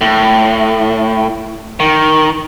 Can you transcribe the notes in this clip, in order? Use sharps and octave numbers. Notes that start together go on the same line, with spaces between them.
A2
D#3